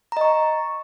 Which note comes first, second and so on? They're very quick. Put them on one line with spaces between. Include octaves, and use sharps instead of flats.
A#5 D#5 C#6